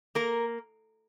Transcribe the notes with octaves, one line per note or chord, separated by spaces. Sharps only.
A#3 A#4